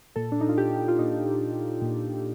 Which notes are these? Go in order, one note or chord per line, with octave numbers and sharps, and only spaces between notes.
A#2 A4
D4
D#4
F4
G4
F4
A#2 D#4
A#2